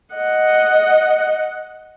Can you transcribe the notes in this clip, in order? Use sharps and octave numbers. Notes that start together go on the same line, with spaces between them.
D#5 F#5